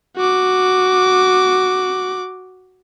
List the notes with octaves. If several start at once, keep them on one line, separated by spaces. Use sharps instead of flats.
F#4 D6